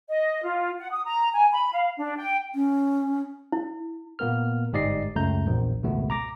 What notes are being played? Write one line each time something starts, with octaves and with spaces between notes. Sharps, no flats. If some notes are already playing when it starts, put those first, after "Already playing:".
D#5
F4
F#5
D#6
A#5
G#5
B5
F5
D4
G5
C#4
E4
A#2 A#3 B3 A#4 F6
G1 G#2 G4 D5 D#5 C7
C#2 F#2 A3 A#5 G6
A#1 E2
G#1 C#2 B2 A3 B3
A#5 D6 A#6